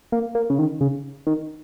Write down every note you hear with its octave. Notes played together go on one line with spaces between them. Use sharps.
A#3
A#3
C#3
D#3
C#3
D#3